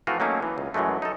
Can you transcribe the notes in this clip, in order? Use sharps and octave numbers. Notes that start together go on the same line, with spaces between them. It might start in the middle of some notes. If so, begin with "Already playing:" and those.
E3 F3 A3 C4 F4 F#4
F#3 A3 A#3 C#4 D#4
E3
C#2
F#2 E3 F#3 G#3 A3
D#4 A4